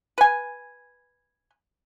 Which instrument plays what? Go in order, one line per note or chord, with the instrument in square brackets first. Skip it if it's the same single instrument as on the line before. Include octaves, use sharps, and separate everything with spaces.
[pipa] B4 G#5